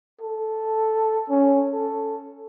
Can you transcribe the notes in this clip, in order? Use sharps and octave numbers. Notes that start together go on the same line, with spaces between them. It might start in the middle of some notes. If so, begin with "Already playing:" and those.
A4
C#4
A4